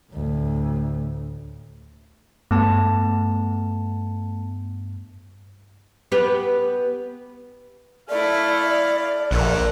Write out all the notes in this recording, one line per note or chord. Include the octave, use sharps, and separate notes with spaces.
D2 A2
G2 A3 B3 A5
B3 G4 B4
A3 E4 D5 F5
A#1 D3 A3 A#4 F#5